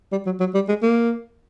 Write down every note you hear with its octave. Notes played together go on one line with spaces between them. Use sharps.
G3
F#3
F#3
G3
G#3
A#3